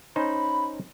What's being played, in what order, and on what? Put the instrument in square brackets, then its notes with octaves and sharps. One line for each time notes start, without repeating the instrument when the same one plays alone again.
[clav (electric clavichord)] C#4 D#4 C5 [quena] B5